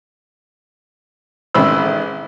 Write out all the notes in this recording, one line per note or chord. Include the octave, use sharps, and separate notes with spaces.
A1 D#3 G#3 C4 B5 E6